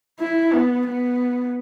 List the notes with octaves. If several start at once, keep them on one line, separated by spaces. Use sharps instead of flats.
E4
B3
B3